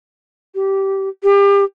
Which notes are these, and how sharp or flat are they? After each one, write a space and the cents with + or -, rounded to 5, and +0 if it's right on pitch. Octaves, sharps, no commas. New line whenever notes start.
G4 -15
G4 +30